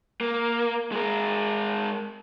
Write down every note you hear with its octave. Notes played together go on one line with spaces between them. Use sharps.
A#3
G#3 A#4